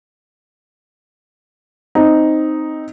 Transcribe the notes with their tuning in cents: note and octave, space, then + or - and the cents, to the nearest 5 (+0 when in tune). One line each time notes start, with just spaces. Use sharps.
C4 +0 D#4 +0